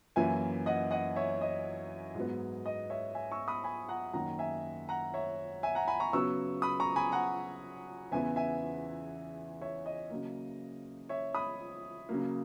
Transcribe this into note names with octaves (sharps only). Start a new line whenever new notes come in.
F#2 E3 A#3 E5 G#5
D#5 F#5
D#5 F#5
C#5 E5
D#5
G#2 F#3 B3
D#5
C#5 E5
E5 G#5
C#6 E6
B5 D#6
G#5 B5
F#5 A#5
F#2 D#3 A#3 F#5 A#5
E5 G#5
F#5 A#5
C#5 E5
E5 G#5
F#5 A#5
G#5 B5
A#5 C#6
C#3 F#3 B3 C#6 E6
B5 D#6
A#5 C#6
G#5 B5
F#5 A#5
E2 C#3 E3 B3 E5 G#5
E5 G#5
C#5 E5
D#5
C#3 F#3 A#3
C#5 E5
B5 D#6
C#3 F#3 A#3